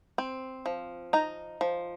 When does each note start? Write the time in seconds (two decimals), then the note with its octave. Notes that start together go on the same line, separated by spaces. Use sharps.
0.18 C4
0.66 F3
1.13 D#4 A#5
1.61 F3